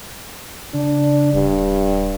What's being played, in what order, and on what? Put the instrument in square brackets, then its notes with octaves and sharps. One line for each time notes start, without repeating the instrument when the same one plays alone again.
[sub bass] C#3 [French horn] D4
[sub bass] D#1 [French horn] G2